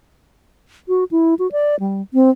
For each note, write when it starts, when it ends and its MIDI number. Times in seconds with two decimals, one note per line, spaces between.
0.88 1.04 66
1.11 1.34 64
1.39 1.50 66
1.52 1.76 74
1.80 2.02 55
2.14 2.30 60